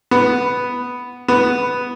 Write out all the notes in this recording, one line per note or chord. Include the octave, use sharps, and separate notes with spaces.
B3
B3